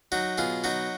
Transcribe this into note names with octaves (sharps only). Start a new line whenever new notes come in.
F#3 D#4 F#4
B2 F4 G#4
F#3 D#4 F#4